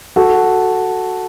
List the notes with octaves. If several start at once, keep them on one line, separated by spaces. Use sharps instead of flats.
F#4 A4